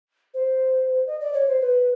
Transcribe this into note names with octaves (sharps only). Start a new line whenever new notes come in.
C5
D#5
D5
C#5
C5
B4